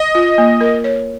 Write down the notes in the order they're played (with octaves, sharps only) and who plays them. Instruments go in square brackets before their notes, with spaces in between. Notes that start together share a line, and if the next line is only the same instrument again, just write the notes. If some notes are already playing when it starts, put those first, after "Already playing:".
Already playing: [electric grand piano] D#5
[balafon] F4
A#3
A#4
C#5